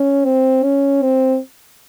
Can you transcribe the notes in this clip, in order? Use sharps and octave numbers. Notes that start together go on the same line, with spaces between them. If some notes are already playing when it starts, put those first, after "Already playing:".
Already playing: C#4
C4
C#4
C4